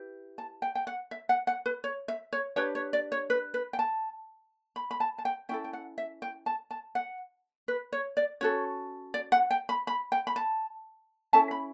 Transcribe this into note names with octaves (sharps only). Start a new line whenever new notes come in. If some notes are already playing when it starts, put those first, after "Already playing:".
Already playing: E4 G4 B4
A5
G5
G5
F#5
E5
F#5
F#5
B4
C#5
E5
C#5
D4 G4 B4 C#5
C#5
D5
C#5
B4
B4
G5
A5
B5
B5
A5
A5
G5
C#4 E4 A4 G5
G5
F#5
E5
G5
A5
A5
F#5
B4
C#5
D5
C#4 F#4 A4 C#5
D5
F#5
G5
B5
B5
G5
B5
A5
C#4 E4 A4 A5
B5